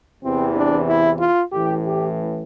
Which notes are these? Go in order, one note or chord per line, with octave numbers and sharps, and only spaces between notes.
E2 C3 E3 C4
D4
E4
F4
A1 A2 E3 G4
G4